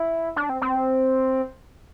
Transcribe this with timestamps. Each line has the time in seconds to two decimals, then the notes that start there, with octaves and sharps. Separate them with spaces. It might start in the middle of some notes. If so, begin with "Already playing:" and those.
Already playing: E4
0.36 D4
0.50 C4
0.62 C4